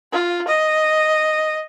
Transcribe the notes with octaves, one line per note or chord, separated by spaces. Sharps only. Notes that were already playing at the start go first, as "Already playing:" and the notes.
F4
D#5